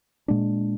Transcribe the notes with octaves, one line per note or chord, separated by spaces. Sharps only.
A#2 G#3 D4